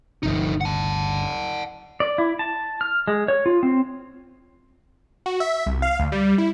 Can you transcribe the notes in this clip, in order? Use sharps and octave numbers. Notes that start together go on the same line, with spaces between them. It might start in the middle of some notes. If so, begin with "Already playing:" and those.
G1 D2 C3 F3 D#4
F#5 A5
D5
E4
A5
F6
G#3
C#5
F4
C4
F#4
E5
C2
F5
D2
G3
E4